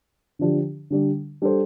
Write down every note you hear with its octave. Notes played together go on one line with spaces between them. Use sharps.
D3 F3 D4 G4
D3 G3 D4
G3 D4 A4 C5